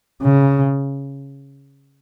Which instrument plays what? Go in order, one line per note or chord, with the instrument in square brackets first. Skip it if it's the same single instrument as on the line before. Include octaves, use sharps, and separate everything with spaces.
[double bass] C#3